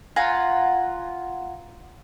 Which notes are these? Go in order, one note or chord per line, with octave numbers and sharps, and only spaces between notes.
F4 F#5 G#5 A#5